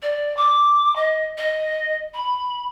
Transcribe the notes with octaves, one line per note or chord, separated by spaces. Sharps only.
D5
D6
D#5
D#5
B5